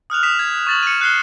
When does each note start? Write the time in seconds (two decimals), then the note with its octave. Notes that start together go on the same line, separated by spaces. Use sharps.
0.10 D#6 F6 F#6 F7
0.23 D#6 B6 E7 F7
0.39 G#6
0.67 C#6 A6 F#7
0.83 C#7 D#7
1.01 F#6 C7 G7